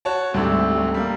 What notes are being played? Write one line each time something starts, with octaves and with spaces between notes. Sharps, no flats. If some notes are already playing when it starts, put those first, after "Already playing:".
F#4 C#5 A5
D2 G#2 G3 A3 C4 D4
G3 A#3